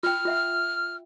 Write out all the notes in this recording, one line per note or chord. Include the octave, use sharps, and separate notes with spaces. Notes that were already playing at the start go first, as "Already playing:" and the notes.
F4 G5 F6
F4 E5 F#5